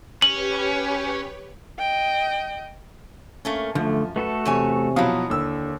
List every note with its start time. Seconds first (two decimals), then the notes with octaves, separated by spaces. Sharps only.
0.22 C#4 G4 B4 C#5 F#7
1.79 D#5 G5
3.45 A3 A#3 C#4
3.75 F#2 D3 F3 A3
4.16 A3 F#4 A4 B4
4.45 E2 C3 C#5 G#5
4.96 B2 F3 F#3 E4 F5 D#6
5.30 D#2 D3 E6